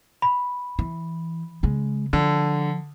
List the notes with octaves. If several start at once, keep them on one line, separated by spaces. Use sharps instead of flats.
B5
E3
C#3 G#3
D3 F3